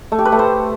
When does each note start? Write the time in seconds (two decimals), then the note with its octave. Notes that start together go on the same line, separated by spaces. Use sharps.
0.12 A3
0.19 G4
0.25 B4
0.32 A3
0.39 C5